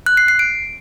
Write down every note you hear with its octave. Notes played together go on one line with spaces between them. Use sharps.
F#6
C7
C7
D7